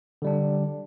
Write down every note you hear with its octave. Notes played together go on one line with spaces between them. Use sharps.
D3 G3 D4